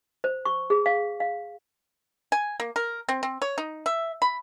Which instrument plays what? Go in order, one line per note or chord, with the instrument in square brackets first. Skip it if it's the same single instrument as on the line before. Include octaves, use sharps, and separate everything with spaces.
[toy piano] C5
C#6
G#4
F5
F5
[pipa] G#5
A#3
A#4
C4
C4
C#5
D#4
E5
B5